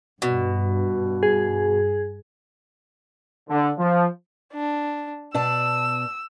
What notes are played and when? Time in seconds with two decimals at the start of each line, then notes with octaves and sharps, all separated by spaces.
0.22 G2 B2
1.23 G#4
3.49 D3
3.77 F3
4.54 D4
5.34 B2 D5 A5 E6